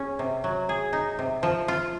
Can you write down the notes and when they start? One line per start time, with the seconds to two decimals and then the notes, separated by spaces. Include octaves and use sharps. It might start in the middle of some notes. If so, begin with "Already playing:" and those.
Already playing: C#4 G#4
0.19 C3
0.44 F#3
0.69 G#4
0.93 D#4
1.19 C3
1.43 F3
1.68 F4